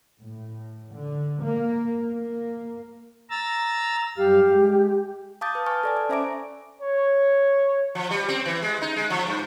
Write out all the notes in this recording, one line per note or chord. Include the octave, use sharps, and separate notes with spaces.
A2
D3
A#3
A#3
A#5 E6 A6
F#2 G3 G4 F5
G#3
F5 A5 D6 D#6 G6 A6
B4
G#5 A5 C#6 F6 A6
A4 D5 G#5
D5
C#4 C5 E5 A#5 D6 D7
C#5
F3
G3
C4
E3
G#3
D#4
G#3
F3
G2